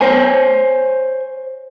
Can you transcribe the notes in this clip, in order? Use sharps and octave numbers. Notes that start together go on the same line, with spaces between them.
C5 C#5 G#5